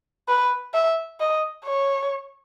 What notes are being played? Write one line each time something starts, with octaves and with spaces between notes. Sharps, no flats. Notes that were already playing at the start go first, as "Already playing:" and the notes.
B4
E5
D#5
C#5